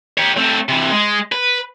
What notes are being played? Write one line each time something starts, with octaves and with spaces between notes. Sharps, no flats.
G4 C#5
A3 C4
C3 E3
G#3
B4